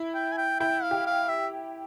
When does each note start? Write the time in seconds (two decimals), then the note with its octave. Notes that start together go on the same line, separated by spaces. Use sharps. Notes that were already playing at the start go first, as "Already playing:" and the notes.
Already playing: E4
0.15 G5
0.32 G#5
0.38 G5
0.60 E4 G5
0.83 F5
0.91 G4
1.06 F5
1.29 E5